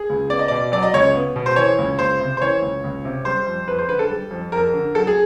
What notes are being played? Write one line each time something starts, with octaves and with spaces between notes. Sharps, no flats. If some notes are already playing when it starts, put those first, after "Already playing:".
Already playing: G#4
C#2
B3 D5
D#5
B2 D5
F#3 D5
D#5
C#2 C#5
B3
B2
C5
E3 C#5
C#2
C#2 C5
C3
C5
E3 C#5
C#2
C#2
C3
G3 C5
F2
F2 B4
C5
D3 B4
A4
G3
F2
F2 A#4
D3
F#3 A4
G#4